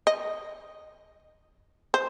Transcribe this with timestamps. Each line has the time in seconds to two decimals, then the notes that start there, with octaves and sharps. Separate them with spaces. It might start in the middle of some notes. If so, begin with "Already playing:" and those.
0.07 D#5
1.94 C5